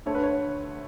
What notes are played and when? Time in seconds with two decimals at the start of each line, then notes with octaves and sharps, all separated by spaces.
0.06 D2 D3 A3 C#5
0.15 B4
0.23 C#5